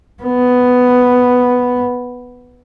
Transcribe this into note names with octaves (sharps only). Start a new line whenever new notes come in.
B3